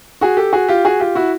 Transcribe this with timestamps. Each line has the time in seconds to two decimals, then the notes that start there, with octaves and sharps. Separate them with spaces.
0.21 F#4 G#4
0.37 G4 A4
0.53 F#4 G#4
0.69 F4 G4
0.85 F#4 G#4
1.00 F4 G4
1.15 E4 F#4